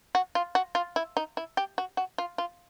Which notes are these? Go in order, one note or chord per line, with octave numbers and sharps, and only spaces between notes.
F#4
F4
F#4
F4
E4
D#4
E4
G4
F#4
F#4
F4
F4